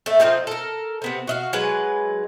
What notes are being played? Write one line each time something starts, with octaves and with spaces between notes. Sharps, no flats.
A3 E5
F3 C4 D#4 F4
A4 A#4
C3 B3 C4
F#4 D#5 F5
F#3 G#3 B4